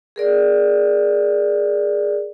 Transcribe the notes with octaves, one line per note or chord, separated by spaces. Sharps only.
G#4 A#4 D5